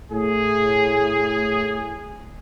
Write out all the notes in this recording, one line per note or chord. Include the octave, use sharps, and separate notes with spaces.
A2 G#4